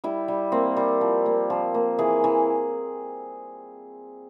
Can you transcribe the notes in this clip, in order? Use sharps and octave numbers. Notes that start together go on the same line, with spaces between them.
G3 E4
G3
A#3 C4
G3
F3
A#3
F3
A#3
E3 G#4
E3